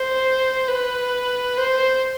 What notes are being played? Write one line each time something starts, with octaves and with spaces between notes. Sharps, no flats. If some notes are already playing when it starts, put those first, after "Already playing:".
Already playing: C5
B4
C5